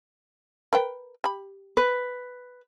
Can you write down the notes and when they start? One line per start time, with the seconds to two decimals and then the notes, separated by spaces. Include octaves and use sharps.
0.73 A#4 B4 G5
1.24 G4 B5
1.77 B4